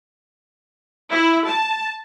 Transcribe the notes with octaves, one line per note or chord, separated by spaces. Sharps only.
E4
A5